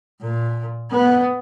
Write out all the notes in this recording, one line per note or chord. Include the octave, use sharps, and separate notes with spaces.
A#2
B3